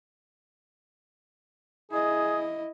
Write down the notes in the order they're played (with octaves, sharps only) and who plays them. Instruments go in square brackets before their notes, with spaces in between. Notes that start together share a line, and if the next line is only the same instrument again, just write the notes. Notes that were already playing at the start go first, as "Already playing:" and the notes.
[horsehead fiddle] E4 D#5 [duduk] G#4